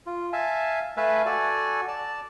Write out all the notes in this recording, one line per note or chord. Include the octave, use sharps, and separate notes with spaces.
F4
E5 F5 G#5 A5
A3 B4 E5 F5 G#5 A5
F#4 A4 D5 G#5
D5 A5